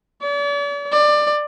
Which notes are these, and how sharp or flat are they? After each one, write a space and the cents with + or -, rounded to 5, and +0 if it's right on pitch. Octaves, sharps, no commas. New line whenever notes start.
D5 -45
D5 +20